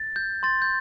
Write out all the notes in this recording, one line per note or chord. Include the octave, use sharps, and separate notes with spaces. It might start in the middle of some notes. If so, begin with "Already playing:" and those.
Already playing: A6
G6
C6 A6
G6